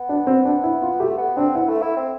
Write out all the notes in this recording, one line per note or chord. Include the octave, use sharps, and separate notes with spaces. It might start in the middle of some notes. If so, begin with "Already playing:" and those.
Already playing: B3
D4
C4
D4
E4
F4
A3 G4
B3
C4 D4
B3 E4
A3
E4
C4